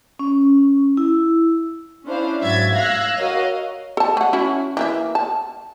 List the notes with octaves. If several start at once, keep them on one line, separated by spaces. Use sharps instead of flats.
C#4
E4
C#4 D4 E4 C5 F5
G#2 F#3 E5 G#6 A6
F5 E6 F#6 G#6 A#6
F#4 A#4 C#5 D#5 F5
A4 A5
A3 F#5
C#4 E4 F#4
E3 A#3 E5
A5